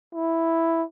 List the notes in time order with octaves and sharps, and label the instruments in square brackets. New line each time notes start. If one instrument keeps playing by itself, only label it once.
[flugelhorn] E4